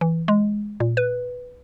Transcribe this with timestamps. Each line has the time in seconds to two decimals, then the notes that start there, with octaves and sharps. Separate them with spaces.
0.01 E3
0.28 G#3
0.80 A#2
0.97 B4